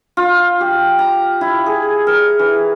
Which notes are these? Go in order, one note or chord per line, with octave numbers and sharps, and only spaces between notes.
F4
G4
A#5
E4
G#4
A#4
E3